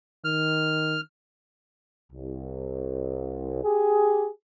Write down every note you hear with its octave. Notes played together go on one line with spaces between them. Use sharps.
D#3 F6
C2
G4 G#4